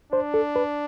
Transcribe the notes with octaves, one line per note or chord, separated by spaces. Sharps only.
D4 C5
A4
B4